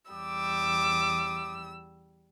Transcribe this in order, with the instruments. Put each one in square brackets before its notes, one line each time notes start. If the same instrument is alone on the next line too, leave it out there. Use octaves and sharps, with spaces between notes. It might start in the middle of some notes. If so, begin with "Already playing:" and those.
[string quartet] E2 G3 E6 [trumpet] D6